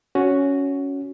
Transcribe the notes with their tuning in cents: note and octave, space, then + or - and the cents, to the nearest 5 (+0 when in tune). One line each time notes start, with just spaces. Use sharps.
C#4 +10 F#4 +0